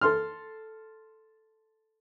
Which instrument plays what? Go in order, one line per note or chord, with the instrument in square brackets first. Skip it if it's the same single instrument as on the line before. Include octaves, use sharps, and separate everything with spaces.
[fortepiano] A4 C6 F6